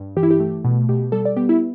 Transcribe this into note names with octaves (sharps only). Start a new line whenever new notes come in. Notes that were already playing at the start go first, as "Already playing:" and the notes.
Already playing: G2
E3 G4
E4
G4
A3
B2
B2 G4
G3 A4
D5
B3 G4
E4